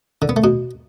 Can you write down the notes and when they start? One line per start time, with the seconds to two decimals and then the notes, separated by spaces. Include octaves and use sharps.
0.22 D3
0.29 B3
0.36 A3
0.44 B2